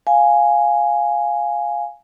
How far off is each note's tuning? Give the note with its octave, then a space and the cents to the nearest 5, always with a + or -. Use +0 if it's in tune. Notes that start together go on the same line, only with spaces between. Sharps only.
F5 +0 G#5 +0